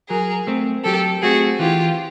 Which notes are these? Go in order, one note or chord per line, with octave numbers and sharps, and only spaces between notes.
F#3 G#4 A#4
A3 C4
F#3 G4 A4
A3 C4 F#4 G#4
E3 F4 G4